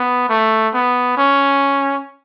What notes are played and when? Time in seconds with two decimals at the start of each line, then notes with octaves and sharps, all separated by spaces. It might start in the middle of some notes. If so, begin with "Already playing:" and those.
Already playing: B3
0.29 A3
0.74 B3
1.17 C#4